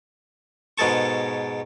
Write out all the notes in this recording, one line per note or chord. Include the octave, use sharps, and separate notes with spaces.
G#2 B2 G#3 A4 A5 C#6